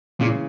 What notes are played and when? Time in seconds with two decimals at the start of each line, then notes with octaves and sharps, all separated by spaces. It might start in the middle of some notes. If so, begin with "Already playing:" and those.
0.20 A#2 C#3 E3 G#3